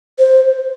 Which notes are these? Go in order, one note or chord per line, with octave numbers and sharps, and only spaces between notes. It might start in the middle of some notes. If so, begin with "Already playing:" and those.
C5